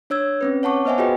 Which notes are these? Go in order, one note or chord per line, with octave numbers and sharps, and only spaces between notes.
D4 C#5 E6 G#6
C4 C#4 B4
C#5 F#5 A5 C#6 D6
B3 C5 D#5 E5 F#5 G#5
F4 F#4 G#4 B4 D#5 G5